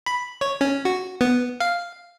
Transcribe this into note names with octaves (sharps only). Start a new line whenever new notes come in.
B5
C#5
C#4
F#4
B3
F5